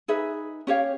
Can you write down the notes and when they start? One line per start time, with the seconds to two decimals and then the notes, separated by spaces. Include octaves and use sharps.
0.08 D#4 G#4 B4 E5
0.67 C#4 G4 C#5 F5